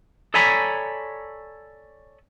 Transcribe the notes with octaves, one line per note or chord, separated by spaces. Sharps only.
A4 C#5 D5 G#5 A#5 B5